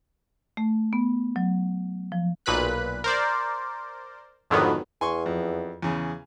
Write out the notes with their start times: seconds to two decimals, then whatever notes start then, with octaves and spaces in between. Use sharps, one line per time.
0.57 A3
0.93 B3
1.36 F#3
2.12 F3
2.46 B1 A#2 B4 B5 F#6
3.04 A#4 C5 D5
4.50 F2 G#2 D3 D#3 F#3 B3
5.01 E2 G#5 C6 C#6
5.26 F2
5.82 E2 C#3